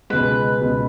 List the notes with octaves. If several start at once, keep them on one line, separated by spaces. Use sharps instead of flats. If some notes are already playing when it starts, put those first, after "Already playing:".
C#2 B2 G#3 B4
C#2 B2 G#3